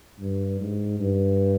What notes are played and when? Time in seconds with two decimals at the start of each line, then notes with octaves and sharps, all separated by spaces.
0.19 G2
0.60 G#2
1.00 G2